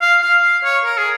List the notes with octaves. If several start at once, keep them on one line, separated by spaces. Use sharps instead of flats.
F5
F5
F5
C#5
A#4
G#4